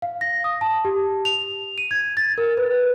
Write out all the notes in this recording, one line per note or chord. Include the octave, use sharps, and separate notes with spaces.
F5
A#6
D#6
A5
G4
F7
D#7
G#6
A6
A#4
B4